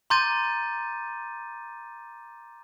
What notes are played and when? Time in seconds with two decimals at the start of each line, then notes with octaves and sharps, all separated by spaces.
0.10 A#5 C6 D6 G6 A6 D#7